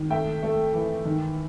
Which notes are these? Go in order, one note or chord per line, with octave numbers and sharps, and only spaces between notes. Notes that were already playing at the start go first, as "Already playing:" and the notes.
Already playing: D#3
A3 E5 G5
A3
E3
D#3